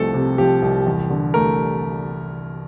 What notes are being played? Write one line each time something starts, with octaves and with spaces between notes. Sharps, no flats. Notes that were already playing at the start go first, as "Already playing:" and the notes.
Already playing: C2 C3 F3 A3 A4
C3
F3 G4
C2
E2
D3
A3 A#4